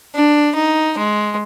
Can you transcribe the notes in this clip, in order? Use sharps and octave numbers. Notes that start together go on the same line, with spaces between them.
D4
D#4
G#3